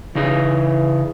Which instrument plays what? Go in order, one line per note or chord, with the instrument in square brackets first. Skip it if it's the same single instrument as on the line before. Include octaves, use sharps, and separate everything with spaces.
[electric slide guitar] C#3 D#4 G#4 [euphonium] E3